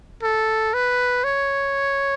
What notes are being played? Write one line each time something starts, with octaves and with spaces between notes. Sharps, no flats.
A4
B4
C#5